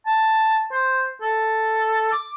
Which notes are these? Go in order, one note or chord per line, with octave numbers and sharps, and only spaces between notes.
A5
C5
A4
D6